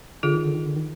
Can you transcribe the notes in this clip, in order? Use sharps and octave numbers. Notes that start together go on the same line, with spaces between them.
D3 F4 G#4
D#3
D3
D#3
D3
D#3